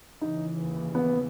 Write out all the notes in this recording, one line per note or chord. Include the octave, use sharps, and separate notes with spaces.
D#2 C#3 E3 D#4
B3